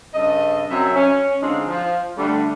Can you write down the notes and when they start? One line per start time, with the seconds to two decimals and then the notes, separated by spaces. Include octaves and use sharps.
0.14 G2 C#3 A4 D#5
0.70 F#2 C3 F#3 E5
0.95 C#4
1.42 D3 G#3 C4 D4 D#4 F4
1.68 F3
2.17 D3 G3 A3